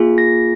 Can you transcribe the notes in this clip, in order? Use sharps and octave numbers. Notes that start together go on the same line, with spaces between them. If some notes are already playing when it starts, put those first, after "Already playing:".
Already playing: A#3 F4 G#4
A#6